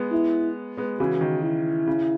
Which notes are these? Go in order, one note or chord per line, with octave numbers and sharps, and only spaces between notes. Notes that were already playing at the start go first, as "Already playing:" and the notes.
Already playing: G#3 B3
E4
G#3 B3
C#3 E3 F#4
D#3
E4
C#3